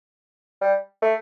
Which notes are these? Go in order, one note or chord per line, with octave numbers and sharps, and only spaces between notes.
G3
A3